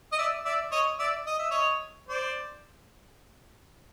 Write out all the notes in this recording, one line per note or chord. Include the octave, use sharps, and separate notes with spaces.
D#5
D5 E5
D5 E5
C#5 D#5
D5 E5
D#5
E5
C#5 D#5
C5 D5